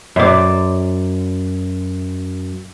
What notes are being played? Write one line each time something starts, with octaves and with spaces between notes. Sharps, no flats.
F#2 D5